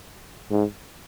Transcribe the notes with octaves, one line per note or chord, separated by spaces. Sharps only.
G#2